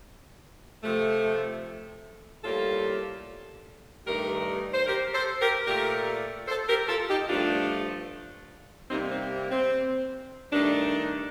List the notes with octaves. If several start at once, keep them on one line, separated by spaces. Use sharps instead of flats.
C3 F3 A3
A2 G3 A#3 F4 A4
G2 D#3 A3 G4 A#4
C5
G4 A#4
A4 C5
G4 A#4
A#2 A3 G4 A#4
A4 C5
G4 A#4
F4 A4
D#4 G4
G2 F3 A3 D4 F4
C3 G3 A#3 C4 D#4
C4
C4
G2 D#3 A3 D4